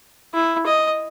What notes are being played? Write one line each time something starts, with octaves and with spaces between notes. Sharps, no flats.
E4
D#5